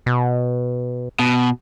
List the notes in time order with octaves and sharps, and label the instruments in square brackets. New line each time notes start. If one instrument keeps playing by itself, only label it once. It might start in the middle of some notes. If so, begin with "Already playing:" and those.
[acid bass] B2
[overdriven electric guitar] B2